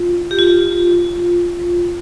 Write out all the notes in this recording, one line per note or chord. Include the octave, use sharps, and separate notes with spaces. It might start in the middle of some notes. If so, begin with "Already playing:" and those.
Already playing: F4
G4
F4